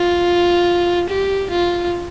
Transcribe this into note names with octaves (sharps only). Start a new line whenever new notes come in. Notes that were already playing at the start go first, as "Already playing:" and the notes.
Already playing: F4
G4
F4